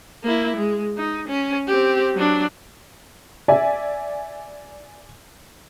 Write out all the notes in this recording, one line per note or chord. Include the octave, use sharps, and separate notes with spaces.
A#3 E4
G#3
D#4
C#4
C4 G4
F#3 D4
D5 E5 G#5